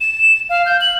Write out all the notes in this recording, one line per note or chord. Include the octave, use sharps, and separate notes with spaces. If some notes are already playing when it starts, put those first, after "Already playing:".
E7
F5
G6
F#7